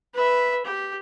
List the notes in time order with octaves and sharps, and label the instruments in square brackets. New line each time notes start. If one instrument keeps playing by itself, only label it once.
[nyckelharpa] B4 E5
G4